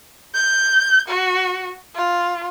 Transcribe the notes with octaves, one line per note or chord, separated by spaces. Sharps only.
G6
F#4
F4